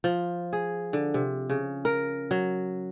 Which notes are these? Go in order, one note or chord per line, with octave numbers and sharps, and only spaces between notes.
F3
G#4
D3
C3
C#3
A#4
F#3